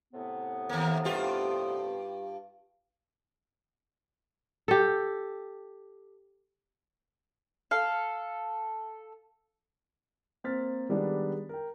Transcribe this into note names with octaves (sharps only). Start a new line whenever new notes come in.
A2 C3 B3
D#2 A#3
G2 F4 G4
G4 A4
A4 F5
A#3 C4 C5 F6 A6 B6
D#3 G3 G#3 B3 D4 D#4
A#4 G5